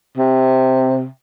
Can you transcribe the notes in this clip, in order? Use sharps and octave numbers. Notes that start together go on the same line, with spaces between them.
C3